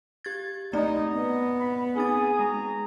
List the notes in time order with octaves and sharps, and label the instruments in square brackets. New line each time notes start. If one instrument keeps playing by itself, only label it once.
[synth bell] G4 G#6 A6
[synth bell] A3 C4 D5 [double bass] D#4 [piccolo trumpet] D#5
[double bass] B3
[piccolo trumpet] B5
[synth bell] C4 D#4 A6 [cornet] G#4 [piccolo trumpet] D#6
[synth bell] G#3 [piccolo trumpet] A#5